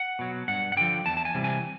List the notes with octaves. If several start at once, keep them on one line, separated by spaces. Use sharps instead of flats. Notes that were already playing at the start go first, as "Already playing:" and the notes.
Already playing: F#5
B2 F#3
G2 F#5
F#5
D3 F3 G5
E2 A5
A5
G#5
C3 E3 G3
G#5